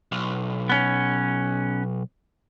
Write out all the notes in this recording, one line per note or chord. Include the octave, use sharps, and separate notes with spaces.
B1
B3 C#4